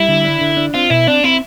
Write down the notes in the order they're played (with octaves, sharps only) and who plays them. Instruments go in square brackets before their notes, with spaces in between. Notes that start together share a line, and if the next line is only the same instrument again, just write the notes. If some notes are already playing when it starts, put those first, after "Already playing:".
Already playing: [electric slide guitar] G3 [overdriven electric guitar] E4
[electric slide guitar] D3
D4
D3
D4
[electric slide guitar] C4 [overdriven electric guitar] F4
[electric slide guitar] B2 [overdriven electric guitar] E4
[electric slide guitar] C4 [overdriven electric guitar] D4
[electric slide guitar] C4 [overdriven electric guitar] E4